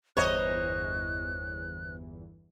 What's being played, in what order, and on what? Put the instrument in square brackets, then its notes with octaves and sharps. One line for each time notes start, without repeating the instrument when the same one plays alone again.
[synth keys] G1 E2 E3 [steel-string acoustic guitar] C5 A#5 [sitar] C#5 D#5 [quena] F#6